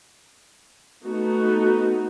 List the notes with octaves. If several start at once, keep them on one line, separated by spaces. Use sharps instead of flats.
A3 B3 D#4 F#4